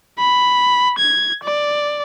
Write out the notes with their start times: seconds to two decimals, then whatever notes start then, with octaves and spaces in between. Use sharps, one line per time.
0.19 B5
0.99 G#6
1.43 D5